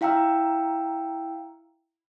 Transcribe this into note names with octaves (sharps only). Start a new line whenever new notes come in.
E4 F5 G5 A#5 E6